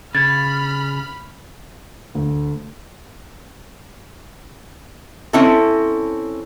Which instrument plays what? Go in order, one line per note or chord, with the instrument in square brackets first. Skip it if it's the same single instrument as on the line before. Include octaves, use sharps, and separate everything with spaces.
[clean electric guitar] C#3 [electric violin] B5 F6 [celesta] G#6 A6
[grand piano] D2
[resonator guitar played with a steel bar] C4 C#4 E4 A4